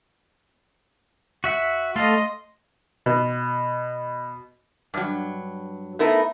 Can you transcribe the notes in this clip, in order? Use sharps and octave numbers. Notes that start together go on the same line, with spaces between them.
F#4 E5 F#5
A3 A4 D#5 F5 C6
B2
G2 F#3
A3 B3 D#4 E4 A#4